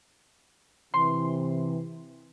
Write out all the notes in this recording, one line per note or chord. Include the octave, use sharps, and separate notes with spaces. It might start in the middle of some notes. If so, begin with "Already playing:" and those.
C3 E3 C6